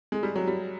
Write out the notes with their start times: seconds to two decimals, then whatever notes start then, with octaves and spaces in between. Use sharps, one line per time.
0.12 G#3
0.23 G3
0.36 F#3
0.47 G3